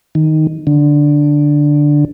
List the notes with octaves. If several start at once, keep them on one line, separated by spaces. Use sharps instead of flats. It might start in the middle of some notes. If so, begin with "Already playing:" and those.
D#3
D3